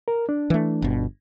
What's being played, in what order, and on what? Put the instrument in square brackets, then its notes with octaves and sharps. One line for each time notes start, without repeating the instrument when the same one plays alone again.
[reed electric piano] A#4
D4
[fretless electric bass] E3 A3
G1 B2